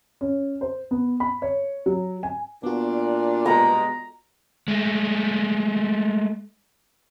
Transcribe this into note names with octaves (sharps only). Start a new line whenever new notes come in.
C#4
C5
B3
B5
C#5
F#3
G#5
A#2 B3 D4 F#4
G2 B2 G#3 A#5
G#3 A3